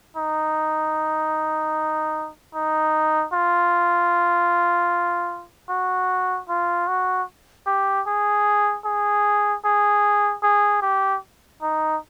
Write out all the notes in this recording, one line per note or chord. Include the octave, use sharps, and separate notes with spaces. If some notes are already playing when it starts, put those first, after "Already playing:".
D#4
D#4
F4
F#4
F4
F#4
G4
G#4
G#4
G#4
G#4
G4
D#4